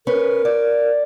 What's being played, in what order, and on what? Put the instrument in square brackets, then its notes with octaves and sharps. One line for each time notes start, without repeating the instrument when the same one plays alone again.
[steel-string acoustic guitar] C#4 B4 [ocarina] A#4
[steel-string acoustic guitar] D5